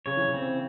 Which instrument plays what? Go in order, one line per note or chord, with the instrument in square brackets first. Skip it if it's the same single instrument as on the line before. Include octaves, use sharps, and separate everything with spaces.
[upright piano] C#3 [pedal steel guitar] C#5
[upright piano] E3
C#3
[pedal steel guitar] C4